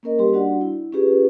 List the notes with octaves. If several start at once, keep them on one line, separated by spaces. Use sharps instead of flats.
A#3 C#4 A#4 D#5
G3 G4 C6
G3 D4 F#4 D5 F#5
E4
C#4 F4 G4 G#4 B4